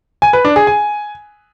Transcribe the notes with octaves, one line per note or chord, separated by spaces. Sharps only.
G#5
B4
D4
G#4
G#5